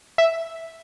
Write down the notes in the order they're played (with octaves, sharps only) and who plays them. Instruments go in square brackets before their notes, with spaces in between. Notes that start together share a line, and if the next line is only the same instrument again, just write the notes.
[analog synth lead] E5